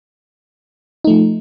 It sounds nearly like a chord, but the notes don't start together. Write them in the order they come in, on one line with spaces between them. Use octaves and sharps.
D#4 A3 F3